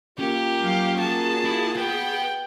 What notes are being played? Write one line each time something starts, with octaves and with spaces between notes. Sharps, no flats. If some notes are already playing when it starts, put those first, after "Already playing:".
A#3 C#4 F4 G4
F#3 F5
F#4 G#4 A5
E4
B4 F#5 G5